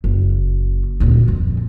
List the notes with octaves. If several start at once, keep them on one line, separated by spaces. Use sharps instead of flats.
F#1
D2 A#2
F2